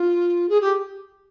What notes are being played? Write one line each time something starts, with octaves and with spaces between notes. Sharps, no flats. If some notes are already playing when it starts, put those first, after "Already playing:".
Already playing: F4
G#4
G4